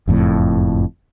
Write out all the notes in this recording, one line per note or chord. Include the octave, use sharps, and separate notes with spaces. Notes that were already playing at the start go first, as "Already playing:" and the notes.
F#1 F2 A2